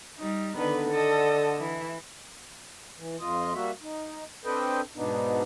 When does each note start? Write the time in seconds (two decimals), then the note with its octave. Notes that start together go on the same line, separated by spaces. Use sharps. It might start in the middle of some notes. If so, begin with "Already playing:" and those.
0.20 G3 D#4
0.57 D3 D#3 B3 B4
0.90 A4 D#5 A5
1.58 E3 E4
2.98 E3
3.20 F2 F4 D#5
3.54 G3 A#3 F#4 E5
3.82 D#4
4.45 C4 D4 A4 B4 D#5 G5
4.96 G#2 B2 B3 D4 D#4